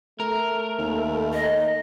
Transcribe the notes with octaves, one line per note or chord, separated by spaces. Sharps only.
A3 A#4
D#2
D#5